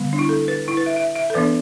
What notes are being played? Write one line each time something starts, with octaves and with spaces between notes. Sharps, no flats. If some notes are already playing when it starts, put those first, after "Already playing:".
Already playing: D3 G3 B3
D4
E4
A4
B4
E4
B4
E5
E5
E5
A4
E3 B3 D4 B4